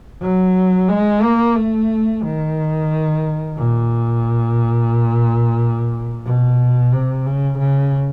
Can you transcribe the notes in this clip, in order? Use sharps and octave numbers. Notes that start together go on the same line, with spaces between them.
F#3
G#3
A#3
A3
D#3
A#2
B2
C3
C#3
C#3